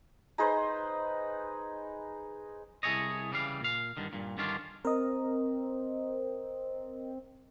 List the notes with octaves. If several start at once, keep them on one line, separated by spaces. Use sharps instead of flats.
D#4 G#4 B4 C5
C2 E4 G#4 A4 C#5 D#5
C#3 E3 G3 F5
A#2 F5
G2 D3 D#3
G2 A#2
G2 D3 D#3 C#4 D4 F4
C4 A#4 D#5